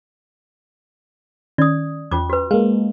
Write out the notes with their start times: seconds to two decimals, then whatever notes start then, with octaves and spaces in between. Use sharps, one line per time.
1.58 D#3 C#4 D5 D#6
2.11 E2 C#4 F4 D6
2.30 F#4 B4
2.51 G#3 A#3 F5